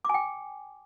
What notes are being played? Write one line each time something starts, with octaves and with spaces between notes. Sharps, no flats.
G5 G#5 D6